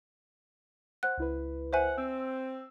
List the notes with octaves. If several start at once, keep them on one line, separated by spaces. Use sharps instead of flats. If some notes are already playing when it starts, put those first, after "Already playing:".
C5 F#5 F#6
C#2 E4 B4
C5 E5 F#5 G#5
C4 E6